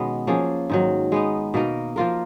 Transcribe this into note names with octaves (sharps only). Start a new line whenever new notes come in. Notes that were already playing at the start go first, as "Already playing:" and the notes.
Already playing: B2 D#3 G#3 B3 C#4
F3 A#3 C#4 G#4
G#2 D#3 F#3
G#3 B3 D#4
B2 A#3 D#4 A#4
F3 A#3 F4 A#4